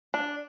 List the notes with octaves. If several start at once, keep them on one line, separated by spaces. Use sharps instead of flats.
D4